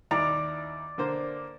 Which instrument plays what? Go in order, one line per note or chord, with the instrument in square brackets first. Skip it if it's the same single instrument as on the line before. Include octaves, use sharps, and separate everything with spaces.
[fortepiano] D#2 E4 A#5 [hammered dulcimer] D5
[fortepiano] D3 A#3 C5